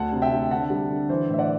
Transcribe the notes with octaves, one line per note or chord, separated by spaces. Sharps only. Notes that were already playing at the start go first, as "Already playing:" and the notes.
Already playing: D2 F#5 A5
C3
E5 G5
C3
D3 F#5 A5
G3
D3
E3 C5
A2 E5
D5 F#5